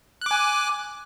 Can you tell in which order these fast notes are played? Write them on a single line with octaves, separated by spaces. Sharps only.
F#6 D6 G#5